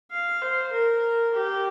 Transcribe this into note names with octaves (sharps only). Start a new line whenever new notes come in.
F5
C5
A#4
G4